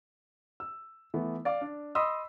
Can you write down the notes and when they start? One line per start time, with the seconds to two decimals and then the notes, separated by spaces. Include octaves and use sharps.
0.60 E6
1.14 E3 A3 B3
1.45 D5 F5 D6
1.61 D4
1.95 D#5 B5 C6 D#6 E6